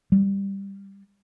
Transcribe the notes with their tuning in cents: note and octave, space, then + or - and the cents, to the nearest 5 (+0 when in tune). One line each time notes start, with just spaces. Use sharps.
G3 +10